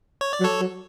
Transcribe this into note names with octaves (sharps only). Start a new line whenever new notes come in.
C#5
D5
F#3
A4 C#5
F#3